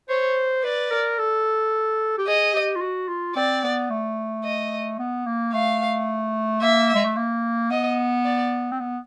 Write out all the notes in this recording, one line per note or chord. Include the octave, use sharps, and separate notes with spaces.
C5 C#5
B4 D5
A#4
A4
G4
G#4 D#5
G4
F4
F#4
F4
C4 D5
B3
A3
D#5
B3
A#3
A3 F5
A#3 E5
G#3
A3
A#3
B3 D#5
D5
C4
B3